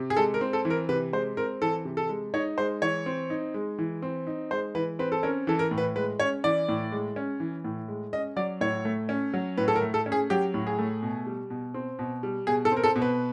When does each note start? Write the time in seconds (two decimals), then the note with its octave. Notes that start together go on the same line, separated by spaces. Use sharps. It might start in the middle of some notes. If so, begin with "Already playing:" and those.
Already playing: C3
0.10 G#4
0.17 G#3 A4
0.34 A#4
0.41 C4
0.53 A4
0.65 E3
0.70 A#4
0.89 C3 B4
1.13 G#3 C5
1.37 C4 A#4
1.62 E3 A4
1.85 C3
1.97 A4
2.09 G#3
2.34 D#4 C#5
2.58 G#3 C5
2.82 E3 C#5
3.06 C4
3.30 D#4
3.54 G#3
3.79 E3
4.02 C4
4.27 D#4
4.51 G#3 C5
4.75 E3 B4
4.99 C4 B4
5.12 A4
5.23 C#4 A#4
5.47 E3 A4
5.59 A#4
5.71 A2
5.78 B4
5.95 G#3 B4
6.20 C#4 C#5
6.44 E3 D5
6.69 A2
6.92 G#3
7.16 C#4
7.40 E3
7.64 A2
7.88 G#3
8.13 C#4 D#5
8.36 F#3 D5
8.61 A2 C#5
8.85 A3
9.09 C#4
9.34 F#3
9.57 A2 B4
9.68 A4
9.76 A#4
9.81 A3
9.94 A4
10.06 C#4
10.12 G#4
10.30 F#3 G4
10.54 A2
10.67 G#4
10.79 A3
11.03 B2
11.27 G3
11.50 B2
11.74 C4
11.99 B2
12.23 G3
12.47 B2 G#4
12.65 A4
12.71 C4
12.77 A#4
12.84 A4
12.96 B2
13.02 B4